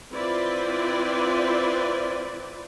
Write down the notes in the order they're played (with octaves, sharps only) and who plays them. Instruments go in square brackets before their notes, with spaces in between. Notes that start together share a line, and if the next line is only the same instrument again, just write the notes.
[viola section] C4 E4 F4 B4 C5 D5